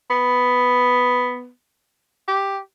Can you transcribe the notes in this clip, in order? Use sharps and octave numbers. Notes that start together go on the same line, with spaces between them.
B3
G4